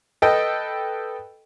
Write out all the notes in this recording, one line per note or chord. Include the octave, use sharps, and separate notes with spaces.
A4 B4 D#5 G5